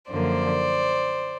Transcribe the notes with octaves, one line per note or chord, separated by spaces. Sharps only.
F#2 D3 F3 A#3 C5 D5